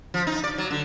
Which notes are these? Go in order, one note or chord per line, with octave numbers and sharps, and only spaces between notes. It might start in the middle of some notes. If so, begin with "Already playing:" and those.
F3
D#4
D5
F#3
D3